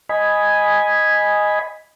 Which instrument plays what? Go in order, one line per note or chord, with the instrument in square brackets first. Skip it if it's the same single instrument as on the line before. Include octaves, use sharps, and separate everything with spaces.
[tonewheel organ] D#5 G#5 B5